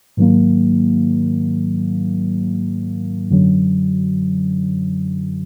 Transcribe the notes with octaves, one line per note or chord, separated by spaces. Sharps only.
G#2 D#3 F#3 A#3
F#2 D3 F#3